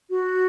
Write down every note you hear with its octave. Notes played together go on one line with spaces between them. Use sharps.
F#4